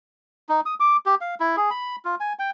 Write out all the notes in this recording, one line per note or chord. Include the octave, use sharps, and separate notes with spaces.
D#4
D#6
D6
G4
F5
E4
G#4
B5
F4
G#5
G5